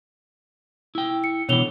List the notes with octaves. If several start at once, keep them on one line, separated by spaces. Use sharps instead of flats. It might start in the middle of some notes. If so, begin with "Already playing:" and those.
E4 G5
C#7
B2 D3 E3 C#5 F7 G7